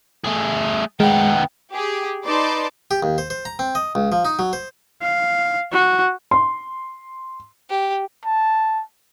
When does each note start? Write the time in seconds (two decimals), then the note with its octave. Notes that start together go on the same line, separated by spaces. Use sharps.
0.24 A3 G#4
1.00 D#3 G#3 B3 G5
1.72 G4 G#4
2.24 D#4 B4 D5 A5 C6 D6
2.91 G4
3.03 D#2
3.18 C5
3.30 C5
3.45 A#5
3.59 C4
3.75 D#5
3.95 C#2
4.12 F3
4.25 D#4
4.39 F#3
4.53 C5
5.02 F5
5.72 F#4
6.31 C6
7.70 G4
8.25 A5